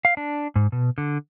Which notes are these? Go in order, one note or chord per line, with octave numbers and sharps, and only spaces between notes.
F5
D4
G#2
B2
D3